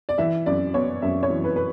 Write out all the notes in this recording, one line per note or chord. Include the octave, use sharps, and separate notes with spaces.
D5
E3 E5
F#2 D5
B3 C#5
F#2 E5
C#5
E3
B4
B4